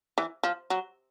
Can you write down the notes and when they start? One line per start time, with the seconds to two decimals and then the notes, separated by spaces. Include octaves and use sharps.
0.18 E3
0.43 F3
0.70 F#3